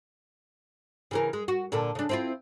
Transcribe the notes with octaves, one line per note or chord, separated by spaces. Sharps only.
C#3 E3 A#4
G#3
F#4
A#2 D3 A4
C#3 D4
C4 E4 F4